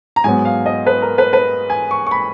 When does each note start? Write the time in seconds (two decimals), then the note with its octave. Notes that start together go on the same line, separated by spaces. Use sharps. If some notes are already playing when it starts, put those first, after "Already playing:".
0.16 A#5
0.24 G#2 F#3 B3 G#5
0.45 F5
0.66 D#5
0.86 B4
1.02 A#4
1.18 B4
1.33 B4
1.70 G#5
1.91 C#6
2.07 C#6
2.11 B5